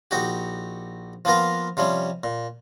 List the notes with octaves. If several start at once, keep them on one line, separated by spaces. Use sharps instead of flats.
A#1 D#4 F#4 G4
F3 A#3 B3 F4 A#4
C3 F3 G3 C#4
A#2